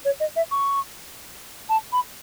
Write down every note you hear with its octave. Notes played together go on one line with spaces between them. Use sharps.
C#5
D#5
E5
C#6
A5
B5